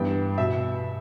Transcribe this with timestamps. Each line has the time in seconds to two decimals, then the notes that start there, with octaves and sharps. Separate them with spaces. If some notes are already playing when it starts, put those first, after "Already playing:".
Already playing: G2 E3 B3 G5
0.38 B2 E5